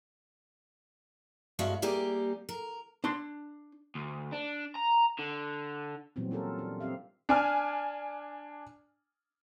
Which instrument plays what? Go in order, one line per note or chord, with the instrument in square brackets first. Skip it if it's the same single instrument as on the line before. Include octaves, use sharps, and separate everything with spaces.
[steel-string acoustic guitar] G2 G#3 F#4 E5 F5
G3 A#3 G4 G#4
A#4
[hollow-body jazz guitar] D4 C6
[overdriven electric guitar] D2
D4
A#5
D3
[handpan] A#2 E3 F#3 G3 B3 C4
C#4 F4 G4 A4 A#4
D4
C4 G4 E5 F5
[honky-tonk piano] D4 G#5 F6